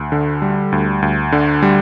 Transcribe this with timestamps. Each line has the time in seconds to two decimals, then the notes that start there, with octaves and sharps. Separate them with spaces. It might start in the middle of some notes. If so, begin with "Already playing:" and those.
Already playing: D2
0.12 D3
0.42 G3
0.72 D2
1.02 D2
1.32 D3
1.62 G3